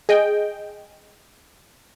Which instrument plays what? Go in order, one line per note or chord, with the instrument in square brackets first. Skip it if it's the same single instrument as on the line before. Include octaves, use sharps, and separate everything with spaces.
[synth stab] G#4 D#5 G5